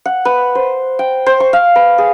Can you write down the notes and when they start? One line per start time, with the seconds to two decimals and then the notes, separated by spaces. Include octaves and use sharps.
0.06 F#5
0.25 B4
0.55 C5
0.99 G5
1.26 C5
1.40 C#6
1.53 F5
1.76 B4
1.98 G#4